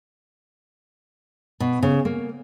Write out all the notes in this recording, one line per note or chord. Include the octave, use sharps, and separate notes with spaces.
B2
C#3
A#3